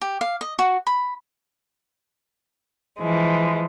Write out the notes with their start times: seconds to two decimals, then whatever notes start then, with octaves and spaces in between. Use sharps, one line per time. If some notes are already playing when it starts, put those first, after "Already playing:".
0.01 G4
0.21 F5
0.41 D#5
0.59 F#4
0.87 B5
2.98 E3 F3 G#3